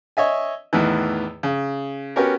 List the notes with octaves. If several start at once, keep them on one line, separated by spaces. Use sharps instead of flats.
C#5 D#5 E5 G#5
E2 A2 D#3 E3
C#3
B3 C#4 F#4 G4 A#4